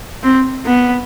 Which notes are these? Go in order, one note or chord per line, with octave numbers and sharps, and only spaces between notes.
C4
B3